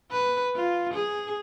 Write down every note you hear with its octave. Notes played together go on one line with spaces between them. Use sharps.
B4
F4
G#4